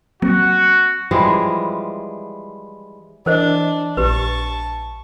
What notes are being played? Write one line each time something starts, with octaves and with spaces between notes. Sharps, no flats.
F#3 A#3 C4 F#4
E3 F3 G3 G#3
E3 D4 A#4 C5 D#5
A#1 G4 B4 A5 C#6